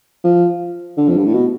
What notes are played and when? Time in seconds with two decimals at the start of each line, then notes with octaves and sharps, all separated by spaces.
0.24 F3
0.97 D3
1.08 F2
1.16 G2
1.25 A2
1.34 B2